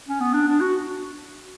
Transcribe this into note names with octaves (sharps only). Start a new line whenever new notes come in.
C#4
B3
D4
D4
F#4